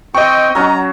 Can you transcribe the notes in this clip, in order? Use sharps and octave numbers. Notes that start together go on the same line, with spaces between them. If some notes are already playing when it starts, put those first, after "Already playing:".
C4 D#5 G5 C#6
F#3 C#4 F#4 A#5